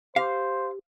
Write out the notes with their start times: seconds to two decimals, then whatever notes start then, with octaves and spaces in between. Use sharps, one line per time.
0.16 G4 C5 F5